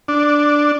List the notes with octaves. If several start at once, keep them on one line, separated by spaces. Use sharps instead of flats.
D4